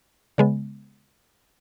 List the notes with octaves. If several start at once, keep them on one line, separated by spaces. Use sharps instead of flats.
C#3 G#3 B3